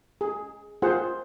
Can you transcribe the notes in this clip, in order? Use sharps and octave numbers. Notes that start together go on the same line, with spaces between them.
G#4
F4 G#4 C5 F#5